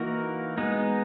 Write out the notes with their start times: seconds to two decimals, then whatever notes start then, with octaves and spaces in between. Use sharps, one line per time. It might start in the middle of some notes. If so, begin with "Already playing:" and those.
Already playing: E3 A#3 D#4 F#4 A#4
0.58 G#3 B3 D#4